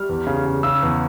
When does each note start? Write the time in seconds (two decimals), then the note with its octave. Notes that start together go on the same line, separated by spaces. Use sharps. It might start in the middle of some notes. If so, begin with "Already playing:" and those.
Already playing: G3 F6
0.09 E2
0.27 C#3
0.45 C#3
0.63 C#3 E6
0.83 E2